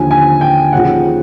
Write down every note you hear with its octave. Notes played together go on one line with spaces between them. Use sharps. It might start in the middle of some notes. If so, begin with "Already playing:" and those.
Already playing: D#2 D3 F3 G#5
G#5
G5
D#2 C#3 F3 F#5